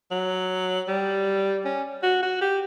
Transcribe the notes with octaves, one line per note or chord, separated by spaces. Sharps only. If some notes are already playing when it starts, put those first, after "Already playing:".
F#3
G3
C#4
F#4
F#4
G4